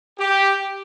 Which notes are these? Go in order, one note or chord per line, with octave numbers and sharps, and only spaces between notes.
G4